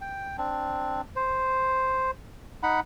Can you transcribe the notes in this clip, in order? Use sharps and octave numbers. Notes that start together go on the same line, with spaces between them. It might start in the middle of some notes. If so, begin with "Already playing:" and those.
G5
C4 D4
C5
D#4 F#5 B5